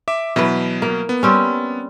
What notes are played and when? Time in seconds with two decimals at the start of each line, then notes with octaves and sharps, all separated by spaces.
0.08 E5 D6
0.36 B2 E3 F#3 B4
0.82 A#3
1.09 B3
1.23 G3 C4 C#4